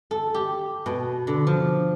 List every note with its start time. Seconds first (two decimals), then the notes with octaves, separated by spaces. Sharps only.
0.11 A4
0.34 G4
0.86 B2
1.27 D3
1.47 F3